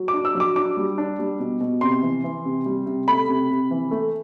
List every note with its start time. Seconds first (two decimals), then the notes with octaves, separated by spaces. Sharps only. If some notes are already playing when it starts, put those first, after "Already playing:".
Already playing: F#3
0.08 D6
0.14 D4
0.25 E6
0.35 F#3
0.40 D6
0.55 D4 D6
0.77 G3
0.98 D4
1.19 G3
1.39 B2
1.60 B2
1.81 C3 C6
2.03 E3
2.24 E3
2.45 C3
2.66 G3
2.86 C3
3.07 A3 B5
3.29 C3
3.50 C3
3.71 E3
3.91 A3